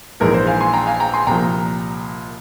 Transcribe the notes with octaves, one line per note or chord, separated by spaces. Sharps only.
A#1 G#2 E3 A#4
C5
F5 G#5
G#5 C6
G5 A#5
F5 G#5
G5 A#5
G#5 C6
C2 A#2 F3 G5 A#5